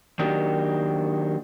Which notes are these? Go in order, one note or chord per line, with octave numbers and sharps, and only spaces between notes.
D#3 F#3 A#3 D4 F#4 G4